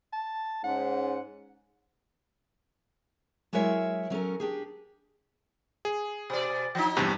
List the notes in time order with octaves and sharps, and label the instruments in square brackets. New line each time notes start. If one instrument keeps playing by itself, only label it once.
[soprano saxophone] A5
[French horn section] G#2 C#4 [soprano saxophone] F#5
[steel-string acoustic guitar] F#3 G#3 E4 A#4 C#5 E5
F#3 C#4 A4 A#4
D4 G4 G#4
[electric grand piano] G#4
[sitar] B2 D5
F3 D#4
[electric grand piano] E2 G2 C3